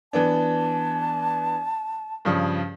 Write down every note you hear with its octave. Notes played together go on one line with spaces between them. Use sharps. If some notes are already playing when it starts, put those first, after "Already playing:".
E3 B3 D4 A5
G2 C#3 F3